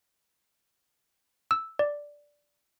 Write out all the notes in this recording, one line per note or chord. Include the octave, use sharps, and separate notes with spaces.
E6
D5